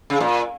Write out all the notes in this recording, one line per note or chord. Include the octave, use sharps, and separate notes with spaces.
C#3
A#2